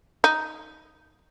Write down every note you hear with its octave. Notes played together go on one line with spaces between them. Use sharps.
D#4